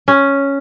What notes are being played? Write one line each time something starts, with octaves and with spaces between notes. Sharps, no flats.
C#4